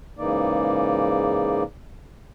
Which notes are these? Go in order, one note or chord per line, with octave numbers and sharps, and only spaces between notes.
G#2 C#3 E3 A#3 D#4 D5